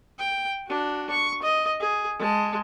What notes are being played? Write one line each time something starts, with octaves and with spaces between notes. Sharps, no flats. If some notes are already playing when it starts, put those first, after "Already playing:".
G5
D4 F#4
C#6
D#5
G#4
G#3 A5